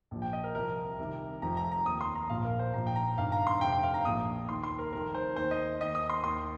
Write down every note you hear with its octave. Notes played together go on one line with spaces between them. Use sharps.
A#1 A#2 F3
G5
D#5
A#4
C2 C3 F3 A#4
C2 C3 D#3
F1 F2 F3 A#5
A#5
A#5
D#2 D#3 D#6
C6
A#5
A#1 A#2 F3 F5
A#4
C5
A#1 A#2 F3 A#5
G5
A#5
G1 G2 D#3 F5
A#5
C6
F1 F2 C3 G5
G5
F5
A#5
A#1 A#2 F3 D#6
D#2 D#3 C6
C6
A#4
F1 F2 D#3 A#4
C5
D#2 D#3 C5
D#5
D#2 D#3 D#5
D#6
C6
D#2 D#3 C6